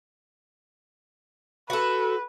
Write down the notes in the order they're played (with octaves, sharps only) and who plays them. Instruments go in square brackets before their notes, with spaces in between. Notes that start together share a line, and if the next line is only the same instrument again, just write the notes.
[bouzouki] F#4 A4 [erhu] B4